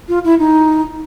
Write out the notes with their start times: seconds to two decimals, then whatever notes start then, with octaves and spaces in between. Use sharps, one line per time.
0.08 F4
0.24 E4
0.39 D#4